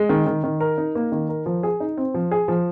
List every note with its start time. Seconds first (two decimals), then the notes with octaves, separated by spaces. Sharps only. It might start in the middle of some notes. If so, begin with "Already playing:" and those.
Already playing: G#3
0.09 D#3
0.27 D#3
0.44 D#3
0.60 A#4
0.78 D#4
0.95 A#3
1.12 D#3
1.29 A#4
1.46 F3
1.63 G#4
1.80 D#4
1.98 C4
2.14 F3
2.31 G#4
2.48 F3